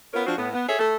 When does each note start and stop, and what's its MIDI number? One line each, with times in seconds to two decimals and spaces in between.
0.13 0.25 59
0.13 0.25 61
0.13 0.25 65
0.13 0.25 70
0.26 0.35 53
0.26 0.35 60
0.26 0.35 62
0.26 0.35 66
0.37 0.49 45
0.37 0.49 59
0.53 0.66 59
0.68 0.76 68
0.68 0.76 69
0.68 0.76 73
0.68 0.76 76
0.79 0.96 57
0.79 0.96 69